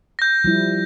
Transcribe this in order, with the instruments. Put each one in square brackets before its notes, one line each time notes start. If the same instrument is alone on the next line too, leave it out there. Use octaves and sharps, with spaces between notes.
[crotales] G6 A#6
[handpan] F3 G3 E4